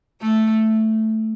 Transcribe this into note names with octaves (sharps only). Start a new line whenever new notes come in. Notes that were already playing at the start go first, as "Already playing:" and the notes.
A3